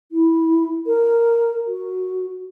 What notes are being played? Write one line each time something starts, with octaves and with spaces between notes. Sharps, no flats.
E4
A#4
F#4